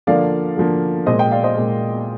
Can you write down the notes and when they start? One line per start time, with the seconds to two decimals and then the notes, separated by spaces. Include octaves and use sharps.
0.07 D3 F3 A#3 D5 F5
0.57 D3 F3 A#3
1.06 A#2 G#3 C5 D#5
1.19 D#5 G5
1.31 D5 F5
1.44 C5 D#5
1.56 A#2 G#3